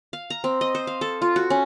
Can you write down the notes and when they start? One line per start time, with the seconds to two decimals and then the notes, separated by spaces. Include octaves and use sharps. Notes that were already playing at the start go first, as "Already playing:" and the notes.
0.13 F5
0.30 A#5
0.44 C4
0.61 D#5
0.75 C5
0.87 F5
1.01 A4
1.22 F4
1.36 F#4
1.50 C#4